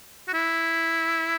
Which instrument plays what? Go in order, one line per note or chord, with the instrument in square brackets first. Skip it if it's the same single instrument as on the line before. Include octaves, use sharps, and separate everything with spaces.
[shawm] F#4
E4